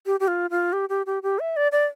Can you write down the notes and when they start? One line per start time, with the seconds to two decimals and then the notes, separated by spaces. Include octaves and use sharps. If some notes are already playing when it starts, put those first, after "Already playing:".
0.06 G4
0.20 G4
0.28 F4
0.51 F4
0.73 G4
0.89 G4
1.06 G4
1.23 G4
1.39 E5
1.56 D5
1.72 D5